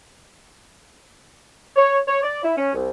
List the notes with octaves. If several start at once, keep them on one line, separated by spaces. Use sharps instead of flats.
C#5
C#5
D5
E4
C#4
C2